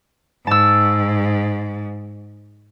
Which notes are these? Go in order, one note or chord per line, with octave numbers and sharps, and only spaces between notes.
G#2 A5 E6